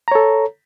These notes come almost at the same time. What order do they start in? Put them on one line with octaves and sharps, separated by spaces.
A#5 C#5 A4